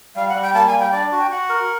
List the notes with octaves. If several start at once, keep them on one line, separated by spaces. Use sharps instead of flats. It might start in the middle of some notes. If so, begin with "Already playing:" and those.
G3 F5
F#5
G3
G5
A#3 A5
G#5
G3
G5
D4 D5
F#4
G5
F#4 F#5
A#4